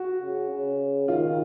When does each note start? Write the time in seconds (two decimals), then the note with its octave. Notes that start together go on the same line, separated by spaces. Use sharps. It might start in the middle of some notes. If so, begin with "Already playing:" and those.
Already playing: F#4
0.21 C#3
0.50 C#3
1.08 D#3 F4